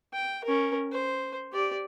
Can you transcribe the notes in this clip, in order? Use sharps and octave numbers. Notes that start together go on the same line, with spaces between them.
G5
C#4 A#4
C5
G4 D5